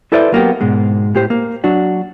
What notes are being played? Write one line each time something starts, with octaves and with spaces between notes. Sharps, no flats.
E4 A4 B4 C5 D5 E5
F#3 A#3 B3 G4
G#2 B2 G#3
A2 G4 C5
A#3
F#3 D4 F#4